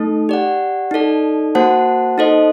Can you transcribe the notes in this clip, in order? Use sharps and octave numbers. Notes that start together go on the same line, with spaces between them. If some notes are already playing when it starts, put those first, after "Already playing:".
Already playing: A3 D#4 A4
G4 D5 F#5
D#4 A4 D5
A#3 F#4 C5 F#5 A5
D#4 A4 C5 D#5